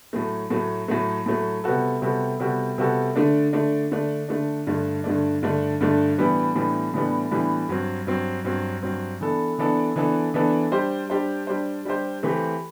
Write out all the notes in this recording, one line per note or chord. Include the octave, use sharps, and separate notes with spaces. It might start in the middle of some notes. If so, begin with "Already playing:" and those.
A2 F#3 A3
A2 F#3 A3
A2 F#3 A3
A2 F#3 A3
C3 G3 B3 F#4 A4
C3 G3 B3 F#4 A4
C3 G3 B3 F#4 A4
C3 G3 B3 F#4 A4
D3 A3 D4
D3 A3 D4
D3 A3 D4
D3 A3 D4
G2 D3 A3 D4
G2 D3 A3 D4
G2 D3 A3 D4
G2 D3 A3 D4
A2 E3 G3 B3 D4
A2 E3 G3 B3 D4
A2 E3 G3 B3 D4
A2 E3 G3 B3 D4
G2 F#3 C4
G2 F#3 C4
G2 F#3 C4
G2 F#3 C4
E3 B3 D4 A4
E3 B3 D4 A4
E3 B3 D4 A4
E3 B3 D4 A4
G3 D4 G4 C5
G3 D4 G4 C5
G3 D4 G4 C5
G3 D4 G4 C5
E3 A3 C4 G4